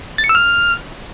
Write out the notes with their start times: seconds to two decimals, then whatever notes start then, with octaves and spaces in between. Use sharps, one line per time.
0.18 A6
0.24 C#7
0.29 E6
0.35 F6